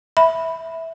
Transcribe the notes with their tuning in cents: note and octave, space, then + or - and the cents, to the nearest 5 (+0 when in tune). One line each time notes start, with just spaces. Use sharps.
E5 -10 B5 +0